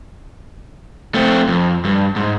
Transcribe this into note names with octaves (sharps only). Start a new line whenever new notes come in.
A3 C4
F2
G2
G#2